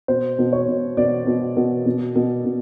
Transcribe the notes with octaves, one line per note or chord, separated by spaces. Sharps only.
B2 C5
B2
C#5
B2
B2 D5
B2
B2
B2
B2
B2